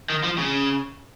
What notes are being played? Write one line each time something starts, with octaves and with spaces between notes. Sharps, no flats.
D#3
F3
C#3